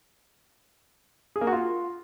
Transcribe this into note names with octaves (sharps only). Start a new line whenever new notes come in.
G#4
A#3
F#4
F4